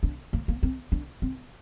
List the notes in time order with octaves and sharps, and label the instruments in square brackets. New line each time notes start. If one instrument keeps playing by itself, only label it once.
[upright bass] D4
A#3
A#3
C4
D4
C4